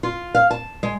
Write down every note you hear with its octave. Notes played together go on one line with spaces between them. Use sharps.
F4
F5
A5
G#3